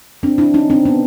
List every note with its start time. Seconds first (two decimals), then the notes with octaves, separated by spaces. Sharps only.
0.23 C4 D4
0.38 D4 E4
0.54 C#4 D#4
0.70 C4 D4
0.85 B3 C#4